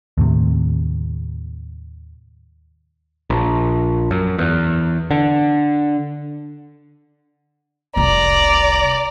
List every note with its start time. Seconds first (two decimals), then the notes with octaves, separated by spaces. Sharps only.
0.18 D#2 A2 C3
3.30 A#1
4.11 F#2
4.39 E2
5.11 D3
7.96 F1 C2 D5 A#5